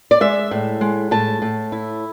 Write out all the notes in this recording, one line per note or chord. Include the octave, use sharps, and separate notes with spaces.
D5
G#3 E5
A2
G#3
A2 A5
A2
E4